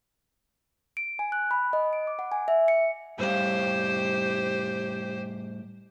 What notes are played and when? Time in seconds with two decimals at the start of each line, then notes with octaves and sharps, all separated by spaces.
0.97 D7
1.19 G#5
1.32 F#6
1.51 B5
1.73 D#5
1.93 D7
2.07 D6
2.19 F#5
2.32 G#5
2.48 E5
2.68 C#7
3.19 A2 G3 G4 C5 F5